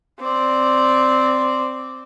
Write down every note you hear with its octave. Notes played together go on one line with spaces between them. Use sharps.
C4 D5